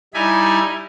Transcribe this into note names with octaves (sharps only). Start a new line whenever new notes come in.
G3 D#4 E4 G#5 B5